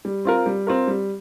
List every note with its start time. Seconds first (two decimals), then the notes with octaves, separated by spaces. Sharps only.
0.05 G3
0.25 C4 F4 A#4
0.46 G3
0.67 C4 F4 A#4
0.88 G3